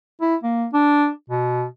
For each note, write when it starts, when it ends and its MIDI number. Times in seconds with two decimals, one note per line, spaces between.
0.21 0.36 64
0.43 0.66 58
0.73 1.10 62
1.30 1.65 47